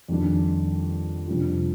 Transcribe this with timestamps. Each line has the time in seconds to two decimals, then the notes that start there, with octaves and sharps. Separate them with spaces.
0.08 F2 D#3 G3 D4
1.28 F2 C3 G3 D4 F4